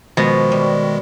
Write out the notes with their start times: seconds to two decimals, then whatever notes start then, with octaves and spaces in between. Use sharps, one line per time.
0.17 B2 D#3 F3 G#3
0.52 G3